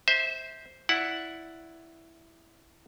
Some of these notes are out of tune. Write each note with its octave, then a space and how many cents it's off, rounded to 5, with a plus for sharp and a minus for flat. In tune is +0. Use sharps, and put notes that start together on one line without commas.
C5 +0 E5 -25
E4 +0 D5 +0 F#5 +0